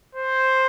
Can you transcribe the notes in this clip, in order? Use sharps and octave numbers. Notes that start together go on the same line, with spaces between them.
C5